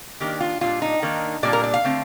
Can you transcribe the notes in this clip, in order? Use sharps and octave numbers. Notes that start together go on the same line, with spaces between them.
D#3 A#3 D4 G4
F4
A#2 G3 D4 F4
D#4
D#3 A#3 D4
A#2 G3 A#3 D4 D5
A#4
D5
F5
D3 A3 C4